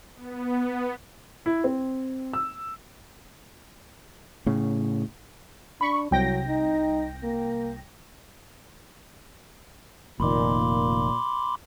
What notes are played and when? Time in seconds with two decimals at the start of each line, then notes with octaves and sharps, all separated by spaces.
0.15 B3
1.46 E4
1.64 C4
2.33 E6
4.46 A2 C#3
5.81 D4 B5 C#6
6.11 C2 F#3 G5 A#6
6.48 D#4
7.23 A#3
10.20 F1 A#2 D#3 B5 C6 D6